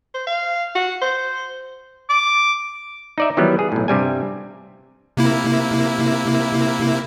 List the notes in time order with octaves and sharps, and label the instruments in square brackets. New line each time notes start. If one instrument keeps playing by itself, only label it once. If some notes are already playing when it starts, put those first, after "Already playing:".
[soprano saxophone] C5
F5
F#4
C5
[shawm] D6
[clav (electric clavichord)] D#4 D5 E5
D#3 E3 F#3 G3 B3
G#4
B1 A2
G2 C3 G3 G#5
[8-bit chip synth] C3 A#3 E4